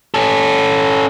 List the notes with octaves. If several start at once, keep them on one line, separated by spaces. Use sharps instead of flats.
C#4 A4